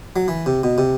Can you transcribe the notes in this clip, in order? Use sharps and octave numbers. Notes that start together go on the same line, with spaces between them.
F#3
E3
C3
B2
C3